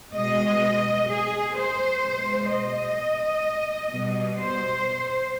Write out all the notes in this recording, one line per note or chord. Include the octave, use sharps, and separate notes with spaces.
B2 G#3 D#5
G#4
C5
B2 G#3
D#5
B2 G3
C5